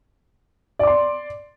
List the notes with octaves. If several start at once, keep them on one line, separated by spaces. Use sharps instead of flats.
D5 C6 D6